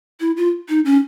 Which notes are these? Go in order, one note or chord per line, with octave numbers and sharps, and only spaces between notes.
E4
F4
D#4
C#4